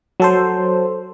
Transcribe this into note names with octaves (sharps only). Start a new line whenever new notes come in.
F#3 A4 C5